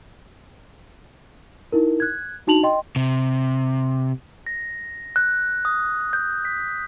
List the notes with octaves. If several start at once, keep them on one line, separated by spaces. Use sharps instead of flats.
D#4 E4 A#4
F#6 G#6
D4 D#4 F#4 A5 F7 F#7
D#5 G5 C6
C3
A#6
F#6
D#6
G6
B6